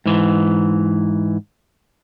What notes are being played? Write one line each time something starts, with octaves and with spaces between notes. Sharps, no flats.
G#2 E3